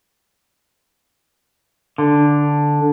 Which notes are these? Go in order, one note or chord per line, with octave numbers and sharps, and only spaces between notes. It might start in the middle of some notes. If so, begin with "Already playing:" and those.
D3